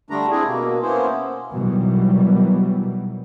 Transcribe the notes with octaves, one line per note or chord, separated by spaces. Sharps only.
D3 G3 A3 D4 A#5
C4 D4 E4 G#4
B2 A#3
A#3 B3 C#4 E4 C5
B2 D#3 E3 F#3 G3